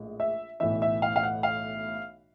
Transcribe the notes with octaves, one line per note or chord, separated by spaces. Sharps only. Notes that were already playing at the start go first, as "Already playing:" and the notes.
Already playing: A#1 A2 G#3
E5
B1 A2 E3 E5
E5
F5
F5
F#5
F5